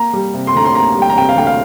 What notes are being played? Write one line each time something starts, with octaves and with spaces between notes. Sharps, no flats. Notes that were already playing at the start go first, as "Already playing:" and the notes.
Already playing: A#3 A#5
G3
C3
C6
D2 A#5
C6
A#3 A#5
G3
G5
A#5
C3 G5
F5
D2 G5
F5